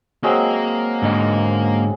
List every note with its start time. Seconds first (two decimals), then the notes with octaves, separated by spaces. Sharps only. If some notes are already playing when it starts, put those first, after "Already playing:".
0.23 F#3 G#3 A#3 C4 A#4
1.02 G#2 D3 D#5